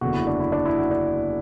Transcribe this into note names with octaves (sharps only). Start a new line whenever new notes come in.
F#1 E2 D3 F#4
E4
D4
E4
D4
E4
F#4
D4